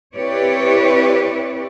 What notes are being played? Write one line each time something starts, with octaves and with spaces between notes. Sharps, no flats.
C4 E4 G4 B4 C#5 D5